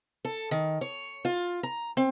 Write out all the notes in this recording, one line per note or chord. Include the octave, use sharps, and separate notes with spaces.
A4
D#3
C#5
F4
A#5
C4